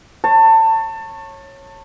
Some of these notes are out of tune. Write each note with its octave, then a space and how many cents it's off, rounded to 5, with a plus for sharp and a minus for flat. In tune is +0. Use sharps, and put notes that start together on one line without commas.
C#5 -15 A5 +25